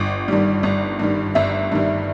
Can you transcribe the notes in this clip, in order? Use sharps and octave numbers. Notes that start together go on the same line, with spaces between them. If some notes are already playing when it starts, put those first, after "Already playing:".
Already playing: G1
G2 D#3 G3
G1
G2 D#3 G3
G1 E5
G2 D#3 G3